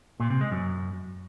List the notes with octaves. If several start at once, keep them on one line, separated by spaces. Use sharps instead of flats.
A#2
C3
G#3
F#2